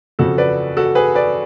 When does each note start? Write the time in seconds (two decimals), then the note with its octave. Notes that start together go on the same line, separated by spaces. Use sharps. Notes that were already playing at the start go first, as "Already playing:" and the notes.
0.19 F2 C#3 F3 F#4 A4
0.38 B4 D5
0.77 F#4 A4
0.95 G#4 B4
1.15 B4 D5